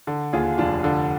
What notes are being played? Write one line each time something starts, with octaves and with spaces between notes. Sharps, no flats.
D3
D#2 F4 G#4
F1 D4 F4
D3